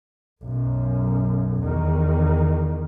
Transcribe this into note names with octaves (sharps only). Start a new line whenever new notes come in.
B1 F#2
E2 D#3